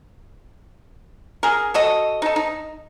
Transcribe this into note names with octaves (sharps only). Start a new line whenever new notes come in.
G#4 A#4
F#4 A4 D#5
D#4 A4
D#4